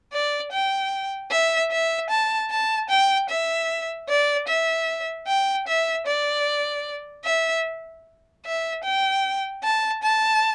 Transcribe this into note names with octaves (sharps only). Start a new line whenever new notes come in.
D5
G5
E5
E5
A5
A5
G5
E5
D5
E5
G5
E5
D5
E5
E5
G5
A5
A5